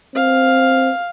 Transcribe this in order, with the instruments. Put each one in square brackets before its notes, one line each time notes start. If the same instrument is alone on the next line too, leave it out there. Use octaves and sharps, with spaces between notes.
[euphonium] C4 [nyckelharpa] F5